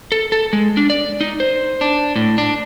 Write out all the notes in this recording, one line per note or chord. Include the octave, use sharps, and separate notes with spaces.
A4
A4
G#3
D4
D5
D#4
C5
D4
A2
D4